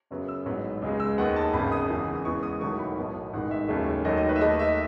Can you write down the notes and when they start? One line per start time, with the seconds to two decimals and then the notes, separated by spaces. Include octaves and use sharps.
0.11 F#2 C#3 F#3 B3
0.28 E6
0.46 A1 G#2 F#3 B3
0.82 C#2 C#3 G#3
1.00 E6
1.18 D#2 D#3 G#3 B3 F#5
1.36 A5
1.53 G#1 F#2 C#3 B5
1.72 D#6
1.90 E2 C#3 E3
2.15 D#6
2.25 E2 C#3 E3 G#3 B3 C#6
2.43 D#6
2.61 E1 E2 D#3 F#3 A3 C#6
2.79 B5
2.97 B1 A2 F#3 B3
3.33 A1 G#2 D#3 F#5
3.51 E5
3.69 D#2 C#3 F#3 A3
4.05 D#2 D#3 F#3 A3 D#5
4.17 D#5
4.29 B4
4.36 E5
4.41 D#2 D#3 A3 D#5
4.59 E5